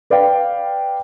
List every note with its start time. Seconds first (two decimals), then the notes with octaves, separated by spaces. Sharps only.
0.10 B4 D5 F5 G5